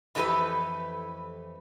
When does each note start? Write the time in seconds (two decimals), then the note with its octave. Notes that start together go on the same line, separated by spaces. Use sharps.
0.15 F2 E3 A3 E4 G4 B4